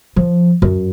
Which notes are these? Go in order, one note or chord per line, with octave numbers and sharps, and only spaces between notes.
F3
F#2